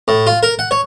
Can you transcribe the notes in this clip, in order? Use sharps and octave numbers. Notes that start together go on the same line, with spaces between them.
A2
F4
A#4
F#5
C#5